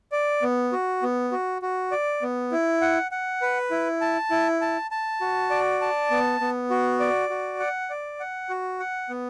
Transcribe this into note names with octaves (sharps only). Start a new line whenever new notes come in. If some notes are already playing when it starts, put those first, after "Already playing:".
D5
B3
F#4
B3
F#4
F#4
D5
B3
E4
F#5
F#5
B4
E4
A5
E4
A5
A5
F#4
D5
A5
B3
B3
F#4
D5
F#4
F#5
D5
F#5
F#4
F#5
B3